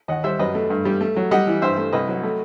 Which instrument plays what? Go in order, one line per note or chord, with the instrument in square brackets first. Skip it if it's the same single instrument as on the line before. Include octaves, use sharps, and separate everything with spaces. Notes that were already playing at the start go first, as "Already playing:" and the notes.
[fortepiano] D#2 D#5 F#5
G3 C5 E5
F#2 B4 D#5
A3
G2
G3
A3
F#3
G3 D#5 F#5
E3
G2 C5 E5
A3
C2 B4 D#5
F#3
A3